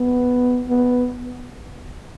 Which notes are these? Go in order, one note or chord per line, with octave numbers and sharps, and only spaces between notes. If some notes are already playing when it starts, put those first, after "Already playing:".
Already playing: B3
B3